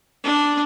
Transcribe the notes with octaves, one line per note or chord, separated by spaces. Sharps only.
D4